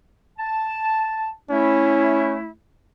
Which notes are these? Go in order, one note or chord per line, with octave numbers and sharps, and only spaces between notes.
A5
A3 C#4 E4